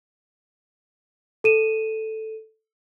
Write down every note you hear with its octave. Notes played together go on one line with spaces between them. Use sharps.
A4 D#7 E7